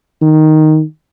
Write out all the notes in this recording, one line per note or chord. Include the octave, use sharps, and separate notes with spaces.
D#3